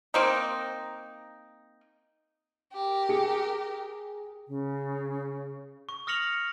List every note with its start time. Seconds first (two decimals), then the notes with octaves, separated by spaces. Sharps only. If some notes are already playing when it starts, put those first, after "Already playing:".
0.14 A#3 C4 D#4
2.75 G4 A#4
3.09 G#4 C#7
4.48 C#3
5.89 C#6
6.07 D#6 F6 A#6 C#7 F7 F#7